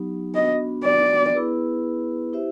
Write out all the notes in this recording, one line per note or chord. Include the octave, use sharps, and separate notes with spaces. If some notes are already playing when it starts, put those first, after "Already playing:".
Already playing: F#3 B3 D#4 G4
B3 D4 F#4 D#5
D5
B3 E4 G#4 B4
E4 G4 C5 E5